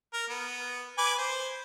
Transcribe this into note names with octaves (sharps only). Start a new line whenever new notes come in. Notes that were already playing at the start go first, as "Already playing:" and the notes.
A#4
B3
B4 G#5 D6
C5